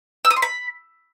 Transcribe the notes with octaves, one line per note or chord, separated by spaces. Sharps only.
E6
D#6
C6
B5